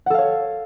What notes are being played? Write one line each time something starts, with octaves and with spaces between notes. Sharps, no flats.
A4 C#5 F5 F#5